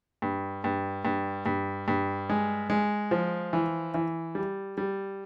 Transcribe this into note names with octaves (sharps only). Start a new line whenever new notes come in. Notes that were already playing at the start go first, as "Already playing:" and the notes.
G2
G2
G2
G2
G2
G#3
G#3
F3
E3
E3
G3
G3